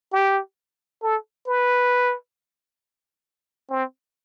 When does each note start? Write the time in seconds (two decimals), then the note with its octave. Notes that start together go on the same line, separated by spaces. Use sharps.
0.13 G4
1.03 A4
1.48 B4
3.70 C4